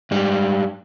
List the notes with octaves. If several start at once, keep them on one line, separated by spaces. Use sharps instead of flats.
G#2 G3